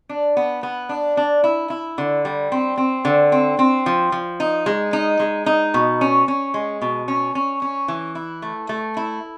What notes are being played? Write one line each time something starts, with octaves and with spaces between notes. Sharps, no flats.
D4
B3
B3
D4
D4
E4
E4
D3
G3
C4
C4
D3
C4
C4
F3
F3
D#4
G#3
D#4
G#3
D#4
B2
C#4
C#4
G#3
B2
C#4
C#4
C#4
E3
E4
A3
A3
E4